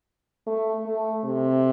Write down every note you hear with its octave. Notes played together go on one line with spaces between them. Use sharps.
A3
A3
C3